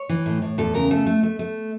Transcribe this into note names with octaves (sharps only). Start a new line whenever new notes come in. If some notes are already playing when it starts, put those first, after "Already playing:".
Already playing: C#5
E3
A2
A2
E2 A4
C#3 A#4
A3 A4
A3
A3
A3